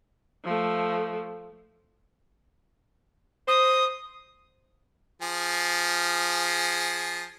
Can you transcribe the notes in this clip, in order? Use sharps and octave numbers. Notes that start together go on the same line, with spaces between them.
F3 A3
C5 D#6
F3 G#4